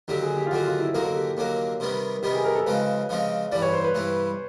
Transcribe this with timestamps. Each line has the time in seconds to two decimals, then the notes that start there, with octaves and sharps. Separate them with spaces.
0.08 D#2 D3 F#3 G4
0.23 G#4
0.36 G4
0.47 F4
0.51 D#2 D3 F#3 F#4
0.65 F4
0.79 E4
0.94 D#2 D3 F#3 A#3 A#4
1.05 A4
1.15 G4
1.37 D#2 D3 F#3 A#3
1.80 C3 D#3 G3 B3
2.23 C3 D#3 G3 B3 G4
2.34 G#4
2.44 A#4
2.55 A4
2.66 C#3 F3 G#3 C4 B4
3.09 C#3 F3 G#3 C4
3.52 G2 E3 G3 D5
3.62 C#5
3.73 C5
3.84 B4
3.95 G2 E3 G3